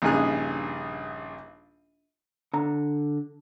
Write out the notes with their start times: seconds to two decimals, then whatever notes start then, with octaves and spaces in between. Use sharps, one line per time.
0.02 A#1 G2 C#3 D#4 G#4 F#6
2.53 D3 A#5